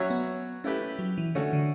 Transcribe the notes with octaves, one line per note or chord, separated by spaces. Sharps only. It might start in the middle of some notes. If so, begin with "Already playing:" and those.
Already playing: F#3 C#4 F#4 C#5 E5
B3
A3 C#4 E4 G4 B4
C#4
F#3
E3
D3 A3 C#4 F#4
D3